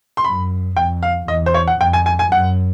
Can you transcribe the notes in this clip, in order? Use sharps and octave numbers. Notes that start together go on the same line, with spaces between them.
C6
F#2 B5
F2 G5
F5
E2 D#5
C5
C#5
F#5
F2 G5
G#5
G#5
G#5
F#2 F#5